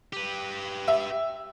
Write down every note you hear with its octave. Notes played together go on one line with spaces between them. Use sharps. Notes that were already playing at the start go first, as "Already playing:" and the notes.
G4 B4
E5